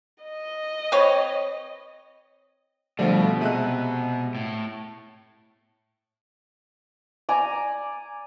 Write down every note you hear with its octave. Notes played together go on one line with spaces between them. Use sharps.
D#5
C4 B4 C#5
B2 D3 F3 G3 A3 F4
C3 G#3 E5 F#6 D#7
A2
D5 G#5 A#5